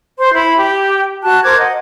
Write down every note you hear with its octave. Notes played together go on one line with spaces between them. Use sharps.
C5 C6
E4 B5
G4
F#4 A5 F#6
A#4 C5 D6 G#6
D#5 F#5